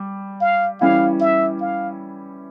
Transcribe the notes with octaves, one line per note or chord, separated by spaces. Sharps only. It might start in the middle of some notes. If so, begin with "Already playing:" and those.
Already playing: G3
F5
E3 G3 C#4 E4 F5
E5
F5